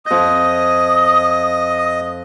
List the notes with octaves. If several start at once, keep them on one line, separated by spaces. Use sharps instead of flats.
F2 D#5 D#6 G6